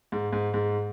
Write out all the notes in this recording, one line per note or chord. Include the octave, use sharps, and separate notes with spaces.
G#2
G#2
G#2